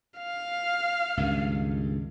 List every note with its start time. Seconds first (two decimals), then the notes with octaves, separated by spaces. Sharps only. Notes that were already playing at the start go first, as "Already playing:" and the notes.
0.18 F5
1.17 C#2 G2 D#3